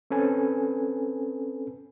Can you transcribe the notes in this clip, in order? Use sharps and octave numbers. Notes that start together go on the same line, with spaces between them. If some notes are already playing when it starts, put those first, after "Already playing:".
C4 C#4 A4 B4 G#5